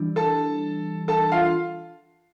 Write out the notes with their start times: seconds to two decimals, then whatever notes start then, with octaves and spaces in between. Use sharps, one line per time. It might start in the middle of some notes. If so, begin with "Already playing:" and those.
Already playing: E3 G3 D4
0.16 A4 A5
1.08 A4 A5
1.32 F4 F5